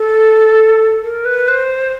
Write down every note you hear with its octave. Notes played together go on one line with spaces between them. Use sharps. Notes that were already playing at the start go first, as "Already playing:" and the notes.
Already playing: A4
A#4
B4
C5